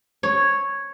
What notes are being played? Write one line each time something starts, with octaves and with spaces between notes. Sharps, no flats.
C#5